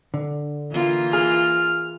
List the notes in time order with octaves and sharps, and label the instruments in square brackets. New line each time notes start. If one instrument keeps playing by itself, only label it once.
[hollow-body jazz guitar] D3
[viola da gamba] E3 A#3 F4
[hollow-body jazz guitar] G#4 [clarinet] F6